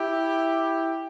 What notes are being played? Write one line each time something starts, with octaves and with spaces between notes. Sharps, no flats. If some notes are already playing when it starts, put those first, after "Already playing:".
Already playing: E4 G4